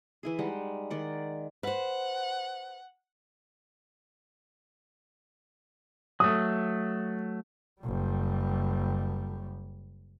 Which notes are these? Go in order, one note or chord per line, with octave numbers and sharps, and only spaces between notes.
E3 E4 G#4
G3 G#3 D#4 F#5
D#3 D5 F#5
B4 C5 F#5
F#3 A3 D#6
F#1 G3